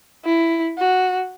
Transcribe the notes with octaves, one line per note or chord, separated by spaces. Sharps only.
E4
F#4